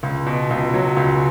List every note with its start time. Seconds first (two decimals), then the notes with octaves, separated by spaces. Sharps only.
0.03 C#2
0.26 B2
0.50 C#2
0.74 F#3
0.97 C#2